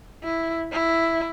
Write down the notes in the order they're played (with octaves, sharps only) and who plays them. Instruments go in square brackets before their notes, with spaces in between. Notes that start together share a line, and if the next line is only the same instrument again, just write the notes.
[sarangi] E4
E4